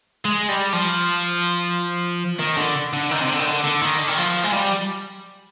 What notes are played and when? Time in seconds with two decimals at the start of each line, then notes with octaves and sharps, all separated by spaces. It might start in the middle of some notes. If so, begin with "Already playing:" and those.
0.25 G#3
0.49 G3
0.73 F3
2.39 D#3
2.57 D3
2.93 D3
3.11 D#3
3.21 C3
3.28 D3
3.39 D#3
3.46 D3
3.64 D3
3.82 D#3
3.98 D3
4.08 D#3
4.17 F3
4.44 G#3
4.53 G3